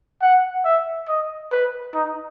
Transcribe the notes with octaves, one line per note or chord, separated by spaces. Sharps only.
F#5
E5
D#5
B4
D#4